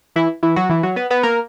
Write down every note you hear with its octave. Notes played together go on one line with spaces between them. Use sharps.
E3 E4
E3 E4
F#3 F#4
E3 E4
F#3 F#4
B3 B4
B3 B4
A#3 A#4